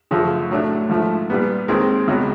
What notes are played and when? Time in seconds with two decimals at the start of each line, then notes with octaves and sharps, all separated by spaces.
0.11 F#2 C#3 F3 A3
0.50 A2 F#3 A3 D4
0.89 G#2 F3 A3
1.30 A#2 G3 B3
1.68 D#2 D#3 G#3 C4
2.08 C#2 B2 F#3